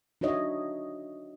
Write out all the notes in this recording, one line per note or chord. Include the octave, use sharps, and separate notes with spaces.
D4 D#4 F#4 C#5 D#5 E5